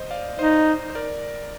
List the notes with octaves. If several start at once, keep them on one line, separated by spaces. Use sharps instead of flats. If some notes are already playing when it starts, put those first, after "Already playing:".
Already playing: C5 D#5
D5 F5
D#4 C5 D#5
C5
A#4 D5